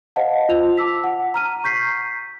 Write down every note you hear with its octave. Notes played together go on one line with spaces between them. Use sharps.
C5 D#5 F5 F#5 A5
F4 F7
A5 D6 E6 B6
F#5
A#5 F6 D#7
C#6 G6 B6 C7